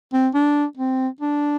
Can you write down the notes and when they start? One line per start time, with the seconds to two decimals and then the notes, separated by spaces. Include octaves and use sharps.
0.13 C4
0.34 D4
0.78 C4
1.21 D4